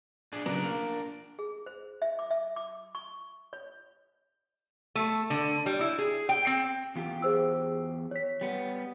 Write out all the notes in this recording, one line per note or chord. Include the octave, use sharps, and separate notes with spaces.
D4 G#4
C#3 F#3 B3 D4 A#4 D5
A#3
G#4
C5
E5
D6
E5
D6
C#6
C#5
A3
D3
G3
E4
G#4
G5
C4
E2 F4 G4
G#4 C5 E6
C#5 B6
G3 B3